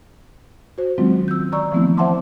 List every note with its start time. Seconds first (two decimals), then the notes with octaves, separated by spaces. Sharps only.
0.78 F#4 C5
0.98 D#3 F#3 G#3 C4 C#4 F4
1.28 E6 G6
1.52 D#3 D5 A#5 C#6 E6
1.72 E3 F3 A3 B3 C4 E4
1.97 C5 E5 F#5 A5 C6 D6